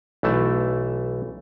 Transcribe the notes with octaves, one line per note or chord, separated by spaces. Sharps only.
B1 E3 A3 A5